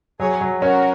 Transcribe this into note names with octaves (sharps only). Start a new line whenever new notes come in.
F#3 G#4 C#5
F#3
C#4 F#4 A#4